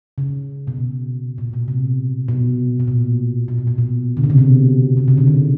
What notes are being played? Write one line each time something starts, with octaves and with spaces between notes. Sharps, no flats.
C#3
B2
C3
A#2
B2
C3
B2
B2
A#2
B2
A#2
B2
B2
D3
C#3
C3
B2
C3
C#3
D3
D#3